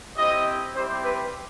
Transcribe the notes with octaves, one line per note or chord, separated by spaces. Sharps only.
C4 E4 G4 D#5
G3 C4 E4 G4 C5
B4